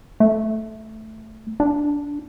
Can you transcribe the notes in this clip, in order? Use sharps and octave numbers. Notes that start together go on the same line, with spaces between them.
A3
D4